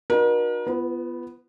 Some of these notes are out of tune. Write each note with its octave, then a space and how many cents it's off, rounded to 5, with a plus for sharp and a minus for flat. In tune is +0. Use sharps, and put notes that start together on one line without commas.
D#4 -40 F#4 -20 A#4 +45
B3 +0 F4 -30 B4 +45